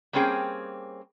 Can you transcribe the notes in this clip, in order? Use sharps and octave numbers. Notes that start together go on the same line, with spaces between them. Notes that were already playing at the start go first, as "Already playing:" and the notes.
G3 A#3 C4 C#4 G#4 G5